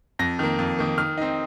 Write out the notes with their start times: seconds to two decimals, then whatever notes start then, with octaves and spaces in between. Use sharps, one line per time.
0.19 F2 A#6
0.39 D#3 A#3
0.59 F2
0.79 D#3 A#3
0.98 D#3 F6
1.17 C4 D#4